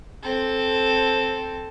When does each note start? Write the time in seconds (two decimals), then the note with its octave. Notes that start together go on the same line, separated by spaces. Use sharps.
0.23 C4 A4